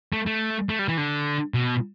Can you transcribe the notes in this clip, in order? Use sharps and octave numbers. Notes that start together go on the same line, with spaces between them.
A3
A3
A3
G3
E3
D3
B2